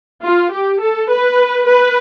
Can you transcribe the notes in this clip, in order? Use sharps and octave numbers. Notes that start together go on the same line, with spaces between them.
F4
G4
A4
B4
B4